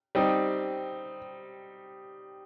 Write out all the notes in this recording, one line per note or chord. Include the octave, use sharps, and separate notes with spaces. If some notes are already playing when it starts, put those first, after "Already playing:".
G3 C4 D#4